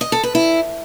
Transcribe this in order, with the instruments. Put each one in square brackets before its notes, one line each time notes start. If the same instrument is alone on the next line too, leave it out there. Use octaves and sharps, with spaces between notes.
[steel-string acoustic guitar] D#5
A4
B4
E4